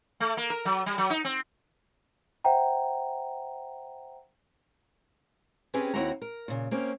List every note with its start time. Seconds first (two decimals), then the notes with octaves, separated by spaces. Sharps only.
0.20 A3
0.37 A#3
0.50 A#4
0.65 F#3
0.86 G3
0.98 F#3
1.10 D#4
1.25 C4
2.44 C5 E5 F#5 G5 A#5
5.74 C4 C#4 G4 G#4 B4
5.93 D#2 C4 E4 F#4 F#5 A#5
6.22 A#4
6.48 A#2 C#3
6.71 A#3 C4 C#4 C#5